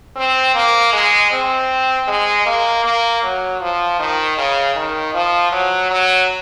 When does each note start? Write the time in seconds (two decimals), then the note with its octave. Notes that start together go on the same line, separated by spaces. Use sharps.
0.16 C4
0.55 A#3
0.93 G#3
1.31 C4
2.08 G#3
2.46 A#3
2.84 A#3
3.23 F#3
3.61 F3
3.99 D#3
4.37 C#3
4.76 D#3
5.14 F3
5.52 F#3
5.91 F#3